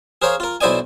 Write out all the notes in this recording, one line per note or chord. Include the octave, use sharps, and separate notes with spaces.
G#4 A#4 C5 C#5 F5
F4 A#4
B1 E4 C5 D5 D#5 G#5